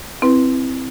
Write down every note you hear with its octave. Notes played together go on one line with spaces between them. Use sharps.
C4 E4 B4